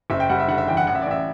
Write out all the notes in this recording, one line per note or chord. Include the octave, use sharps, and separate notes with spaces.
F#1 E5
G5
G3 F#5
E5
D3 F#5
E5
E2 G5
F#5
A1 F#5
E5
D5
A1 E5